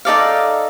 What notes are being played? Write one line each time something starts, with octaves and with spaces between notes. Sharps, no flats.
D#4 A4 D5 F5